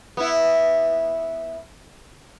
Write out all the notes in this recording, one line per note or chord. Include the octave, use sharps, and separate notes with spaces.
B3 E4